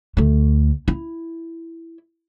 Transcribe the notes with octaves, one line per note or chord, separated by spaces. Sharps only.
D2 A3
E4